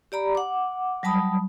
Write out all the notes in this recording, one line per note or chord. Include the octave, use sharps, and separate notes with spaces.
G4 D5 A#5 B5
F#5 D6
F#3 G3 A5 B5 D#6